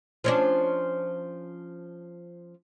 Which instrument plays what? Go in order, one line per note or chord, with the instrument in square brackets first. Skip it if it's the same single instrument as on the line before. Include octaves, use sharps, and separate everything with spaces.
[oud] F3 C#4 D4